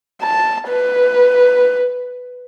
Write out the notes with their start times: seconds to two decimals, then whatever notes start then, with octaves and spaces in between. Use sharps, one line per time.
0.22 A5
0.69 B4